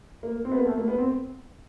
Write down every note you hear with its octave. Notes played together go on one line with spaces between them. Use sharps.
A#3
C4
B3
A#3
A3
A#3
B3
C4